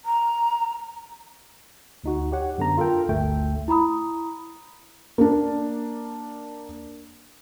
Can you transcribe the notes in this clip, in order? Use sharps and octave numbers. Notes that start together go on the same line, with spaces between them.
A#5
D2 D#4 F#4
G4 C#5 F#5
F#2 D3 B3 A#5
F4 A4 A#4 G5
G1 D2 A3 G5
E4 A#5 B5 D#6
A#3 D4